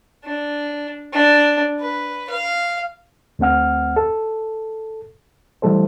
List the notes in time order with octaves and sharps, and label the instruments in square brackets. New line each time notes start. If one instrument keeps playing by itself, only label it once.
[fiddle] D4
D4
B4
F5
[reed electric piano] D2 A3 C4 F#5 F6
A4
E3 G3 A3 A4 C5